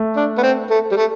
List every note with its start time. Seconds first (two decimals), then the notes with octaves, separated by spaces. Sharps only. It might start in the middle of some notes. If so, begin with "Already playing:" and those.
Already playing: A3
0.16 D4
0.38 B3
0.43 C4
0.70 A3
0.91 G3
0.96 A3